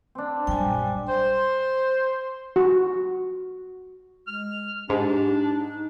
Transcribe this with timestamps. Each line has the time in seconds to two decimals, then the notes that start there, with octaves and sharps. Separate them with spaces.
0.15 C4 D4
0.47 A#1 F#2 G3 G5 G#5
1.09 C5
2.56 F#4
4.28 G#3 F6
4.89 G#2 D4 G4
5.25 D#4